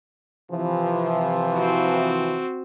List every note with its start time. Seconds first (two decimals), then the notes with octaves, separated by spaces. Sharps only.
0.52 C3 E3 F3
1.54 C4 F#4